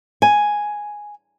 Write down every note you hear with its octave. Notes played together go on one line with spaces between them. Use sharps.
G#5